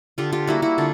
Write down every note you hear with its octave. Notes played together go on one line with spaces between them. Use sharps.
D3 F4 G4
F4 G4
G3 A#3 E4 F#4
E4 F#4
D3 F4